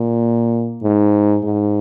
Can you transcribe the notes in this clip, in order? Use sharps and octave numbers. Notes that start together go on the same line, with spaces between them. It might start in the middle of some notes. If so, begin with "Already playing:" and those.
Already playing: A#2
G#2
G#2